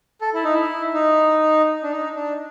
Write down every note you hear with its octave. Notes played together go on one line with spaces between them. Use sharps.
A4
E4
D#4
E4
D#4
D4
D#4
D4